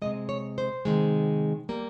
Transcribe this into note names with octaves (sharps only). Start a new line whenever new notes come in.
C3 D#3 G#3 D#5
C#5
C5
C3 D#3 G#3
G3 A#3